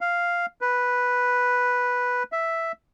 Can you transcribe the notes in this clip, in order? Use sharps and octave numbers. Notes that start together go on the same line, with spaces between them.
F5
B4
E5